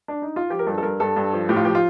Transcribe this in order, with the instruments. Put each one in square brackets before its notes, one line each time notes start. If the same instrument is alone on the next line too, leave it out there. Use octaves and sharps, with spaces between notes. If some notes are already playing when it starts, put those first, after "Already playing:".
[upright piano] D4
D#4
F4
F3 G4
A#4
G2 A4
A4
G2 A#4
G2 A4
G2
F3
A2 G4
F4
F3 G4
F4